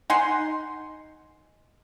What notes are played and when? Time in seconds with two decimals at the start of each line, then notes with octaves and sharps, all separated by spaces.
0.10 D#4 F#5 G#5 C6